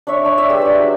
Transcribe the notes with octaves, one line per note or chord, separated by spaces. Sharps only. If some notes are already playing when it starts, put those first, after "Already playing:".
D4 C#5 E5 C#6
D4
E5
G#3 G4 B4
D4 D5
F#3